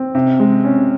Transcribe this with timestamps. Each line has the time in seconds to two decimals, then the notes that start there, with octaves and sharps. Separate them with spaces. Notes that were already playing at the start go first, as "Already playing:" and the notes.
Already playing: C4
0.15 C3
0.40 G#3
0.64 C#4